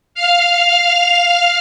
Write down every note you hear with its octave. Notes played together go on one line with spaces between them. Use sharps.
F5 F6